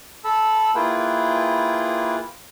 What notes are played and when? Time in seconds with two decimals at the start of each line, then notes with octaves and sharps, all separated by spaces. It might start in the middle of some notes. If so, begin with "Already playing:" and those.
0.24 A4 A5 B5 E6
0.75 A#3 E4 F4 G#4 B4 G5